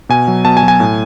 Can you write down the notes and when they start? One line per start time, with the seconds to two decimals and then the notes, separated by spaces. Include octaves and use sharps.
0.09 B2 G#5
0.28 F#3
0.45 B2 A5
0.57 G#5
0.63 F#3
0.68 G#5
0.80 A2